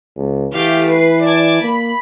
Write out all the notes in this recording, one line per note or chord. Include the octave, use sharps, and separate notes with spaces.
C#2
E3 A3 G4 F5
B4 C7
D5 A5 G#6
A#3 B5